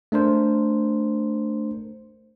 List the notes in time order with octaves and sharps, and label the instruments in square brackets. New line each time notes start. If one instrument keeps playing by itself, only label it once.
[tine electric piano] A3 D4 A#4 C5